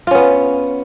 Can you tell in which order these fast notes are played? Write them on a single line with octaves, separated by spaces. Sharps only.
F4 C#4 B3